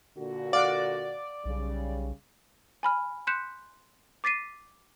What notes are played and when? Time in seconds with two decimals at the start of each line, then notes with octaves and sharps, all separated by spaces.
0.17 A#2 D3 F#4
0.53 D5 F5 F#5
1.45 B1 C#3 G3
2.83 G#5 B5 F6
3.27 C6 F#6 G6 B6 C#7 E7
4.24 D6 A6 B6 C7 D#7